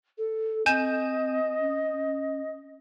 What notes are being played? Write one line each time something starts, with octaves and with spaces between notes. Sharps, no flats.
A4
C4 D#5 G#5 G6 E7
C#4